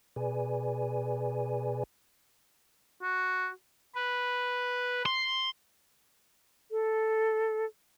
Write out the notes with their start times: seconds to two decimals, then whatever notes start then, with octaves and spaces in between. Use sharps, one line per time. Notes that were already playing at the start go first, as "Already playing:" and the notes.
0.16 B2 G#4 B4 D5 G#5
3.03 F#4
3.95 B4
5.06 C6
6.71 A4